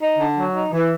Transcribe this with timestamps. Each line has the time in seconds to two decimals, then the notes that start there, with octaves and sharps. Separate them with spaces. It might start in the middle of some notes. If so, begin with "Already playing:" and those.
0.01 D#4
0.19 D3
0.38 F#3
0.54 D#4
0.72 E3